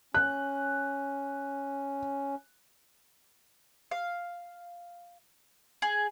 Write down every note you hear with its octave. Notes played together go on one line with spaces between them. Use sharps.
C#4 F#6
F5
G#4